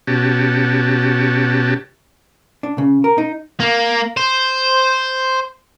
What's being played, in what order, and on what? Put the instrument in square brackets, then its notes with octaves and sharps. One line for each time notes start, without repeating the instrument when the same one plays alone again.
[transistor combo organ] B2 C#4 F#4 G4 A5
[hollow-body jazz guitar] D4
C#3
A#4
D#4
[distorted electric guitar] A#3
C5